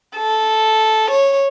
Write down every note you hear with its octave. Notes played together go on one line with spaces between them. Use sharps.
A4
C#5